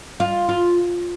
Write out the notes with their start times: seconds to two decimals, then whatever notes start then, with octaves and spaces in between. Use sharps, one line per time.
0.20 F4
0.49 F4